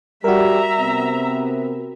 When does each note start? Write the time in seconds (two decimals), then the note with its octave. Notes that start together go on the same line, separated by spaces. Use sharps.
0.24 G3 F#4 A#4 E5 A#5
0.80 C3 B3 C4